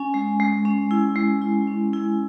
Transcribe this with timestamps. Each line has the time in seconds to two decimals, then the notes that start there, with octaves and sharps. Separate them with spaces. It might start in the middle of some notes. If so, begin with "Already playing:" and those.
Already playing: C#4 G#5
0.14 G#3
0.40 G#3
0.65 C#4
0.91 E4
1.16 G#3
1.42 E4
1.67 C#4
1.93 E4